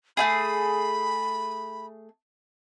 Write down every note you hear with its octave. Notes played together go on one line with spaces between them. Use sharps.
A3 E4 G#4 B5